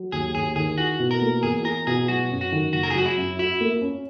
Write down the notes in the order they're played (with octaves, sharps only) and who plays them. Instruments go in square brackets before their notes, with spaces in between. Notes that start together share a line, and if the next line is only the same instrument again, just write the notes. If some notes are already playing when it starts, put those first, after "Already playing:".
Already playing: [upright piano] F#3
[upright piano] D#2 [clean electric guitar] G#4
[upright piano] D#2 [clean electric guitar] G#4
[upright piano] D#3 [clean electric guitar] G#4
[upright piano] E4 [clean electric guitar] F#4
[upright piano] B2
[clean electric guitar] A#4
[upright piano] A#3
[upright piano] E2 [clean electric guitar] G#4
[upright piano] E4 [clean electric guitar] A#4
[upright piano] B2 [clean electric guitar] G#4
[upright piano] F#3 [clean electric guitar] F#4
[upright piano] F#2
[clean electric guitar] F#4
[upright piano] D#3
[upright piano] F#1 [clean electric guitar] F#4
[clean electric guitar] A#4
G#4
[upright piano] F#3 [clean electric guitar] F#4
[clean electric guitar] E4
[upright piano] F#2
[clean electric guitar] E4 [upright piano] F#4
[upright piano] A#3
C#4